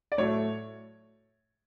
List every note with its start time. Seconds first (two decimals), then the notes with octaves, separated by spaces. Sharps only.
0.12 D5
0.18 A2 F#3 A3 C#5